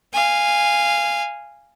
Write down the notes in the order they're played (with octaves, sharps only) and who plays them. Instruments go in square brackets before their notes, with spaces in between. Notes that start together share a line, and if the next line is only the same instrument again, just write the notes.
[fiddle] F5 G#5